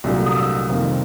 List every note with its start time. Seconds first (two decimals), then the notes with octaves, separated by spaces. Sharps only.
0.04 C2 A#2 F#3 A3 D4
0.26 D#6
0.37 E6
0.69 F2 C3 D#3 G3 A#3